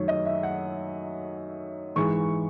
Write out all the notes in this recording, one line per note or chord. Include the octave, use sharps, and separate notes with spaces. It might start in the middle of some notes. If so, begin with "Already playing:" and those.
Already playing: F#2 D#3 F#3 A3 C#5
D#5
E5
F#5
G#2 E3 G#3 C#6